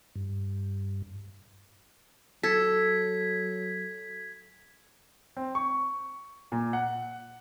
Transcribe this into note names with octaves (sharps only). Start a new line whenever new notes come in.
G2
F#3 A4 G#6 B6
C4
C#6
A#2
F#5